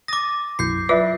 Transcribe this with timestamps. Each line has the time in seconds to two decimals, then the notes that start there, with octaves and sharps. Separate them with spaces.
0.08 D6 D#6 A6 A#6
0.59 B1 F#2 E4 G6 C7
0.89 F#3 F4 B4 D5 E5 D6